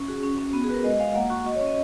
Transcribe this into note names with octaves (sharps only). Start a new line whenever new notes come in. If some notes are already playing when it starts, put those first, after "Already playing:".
Already playing: C#4
F#4 G#4
C#4
C#4
B3 F#4
G#4
F#4 A#4 B4
G#3 D#5
G#3 F5
A#3 F#5
F#4 C#6
F#4 D#5
C#5
C#4
D#5